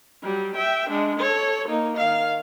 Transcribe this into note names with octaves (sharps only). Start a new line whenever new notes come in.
F#3 G3
E5 G5
G#3 D4
A4 C#5
A#3 D#4
D#3 F5